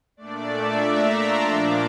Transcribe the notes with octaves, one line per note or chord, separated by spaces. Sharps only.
A#2 A3 D4 D5
E5
A#5
C6
A#2 F3 A#3 D4 D6